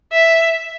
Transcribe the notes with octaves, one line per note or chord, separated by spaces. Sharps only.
E5